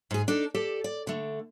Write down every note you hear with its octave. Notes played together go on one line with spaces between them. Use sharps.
G#2 G#4
D4 D#4 A4
G4 A4 D5 A5
D5
D3 A3